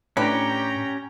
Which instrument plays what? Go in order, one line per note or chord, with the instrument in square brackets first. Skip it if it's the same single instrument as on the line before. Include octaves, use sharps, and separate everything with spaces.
[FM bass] A2 [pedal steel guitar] C#4 G4 [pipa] D4 B4 [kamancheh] G5 A#5